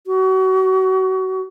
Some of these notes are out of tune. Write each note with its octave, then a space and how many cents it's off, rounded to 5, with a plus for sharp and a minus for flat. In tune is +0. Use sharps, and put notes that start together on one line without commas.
F#4 +30